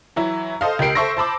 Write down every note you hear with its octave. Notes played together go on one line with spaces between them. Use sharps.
E3 F#3 E4
A4 C5 D#5 F5
C#2 G4 A#4 C7 D7
A4 C5 E5 C#6 E6 A#6
C5 A5 B5 D6